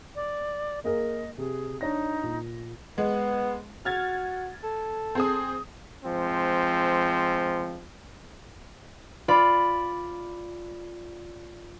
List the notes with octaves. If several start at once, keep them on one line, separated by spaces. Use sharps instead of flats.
D5
A#3 G#4 A#4 D#5
C3 G#4
D4 D#4 C#5 A#6
A#2
G#3 B3
F#4 F6 G#6 A6
A4
C4 G#4 D#6
F3 G#3 C4
F4 D5 B5